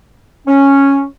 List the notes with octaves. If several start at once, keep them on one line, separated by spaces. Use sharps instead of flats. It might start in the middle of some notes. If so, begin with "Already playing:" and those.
C#4